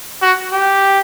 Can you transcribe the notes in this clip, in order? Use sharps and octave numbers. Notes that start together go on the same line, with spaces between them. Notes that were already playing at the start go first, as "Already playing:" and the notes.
F#4
G4